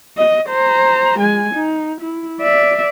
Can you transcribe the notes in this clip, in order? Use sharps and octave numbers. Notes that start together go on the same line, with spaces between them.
D#5
C5 A#5
G#3 G#5
D#4
E4
D5 E5